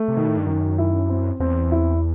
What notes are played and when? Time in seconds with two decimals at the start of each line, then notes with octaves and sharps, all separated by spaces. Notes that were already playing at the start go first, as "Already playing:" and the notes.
Already playing: A3
0.08 C3
0.17 B2 D#3
0.28 A2
0.37 G2
0.47 F#2 D#3
0.78 E4
1.10 C4
1.40 E2 C4
1.72 E4